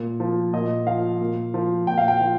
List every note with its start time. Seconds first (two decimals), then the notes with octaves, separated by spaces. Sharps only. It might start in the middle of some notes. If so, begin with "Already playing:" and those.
Already playing: A#2
0.20 F3
0.53 A#2 D#5
0.87 F3 F5
1.20 A#2
1.54 F3
1.87 A#2 G5
1.98 F5
2.08 G5
2.21 F3